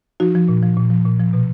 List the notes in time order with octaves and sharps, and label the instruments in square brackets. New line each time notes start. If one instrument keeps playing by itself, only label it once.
[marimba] F3 D#4 F#4
F3
A#2
F3
A#2
F3
A#2
F3
B2